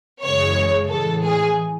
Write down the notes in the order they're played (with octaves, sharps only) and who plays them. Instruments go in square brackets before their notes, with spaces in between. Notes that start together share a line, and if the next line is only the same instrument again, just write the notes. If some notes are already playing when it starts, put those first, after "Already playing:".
[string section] F#2 C#3 E3 G#3 C#5
A2 E3 G#3 A4
G#4